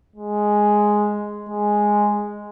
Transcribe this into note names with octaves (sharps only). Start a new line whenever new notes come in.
G#3
G#3